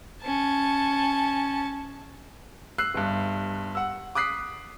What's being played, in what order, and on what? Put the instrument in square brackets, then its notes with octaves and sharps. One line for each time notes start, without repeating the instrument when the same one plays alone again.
[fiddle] C#4 A5
[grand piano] E6 F#6 C7
G1 G2
F#5 E6
D6 D#6 F#6 B6 C7